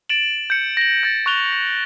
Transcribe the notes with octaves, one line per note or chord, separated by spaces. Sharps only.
A6 D7 E7 F#7
G6 C#7
A#6 F#7
G6 A6
C#6 F#6 F7 G7
A#6